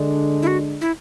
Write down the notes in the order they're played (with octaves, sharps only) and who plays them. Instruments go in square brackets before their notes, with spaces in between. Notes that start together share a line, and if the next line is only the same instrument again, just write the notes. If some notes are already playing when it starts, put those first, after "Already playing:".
Already playing: [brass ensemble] D3 G#3 D4
[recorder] E4
F#4
E4